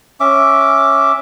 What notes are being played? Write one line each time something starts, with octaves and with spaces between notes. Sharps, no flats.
C#4 E5 D6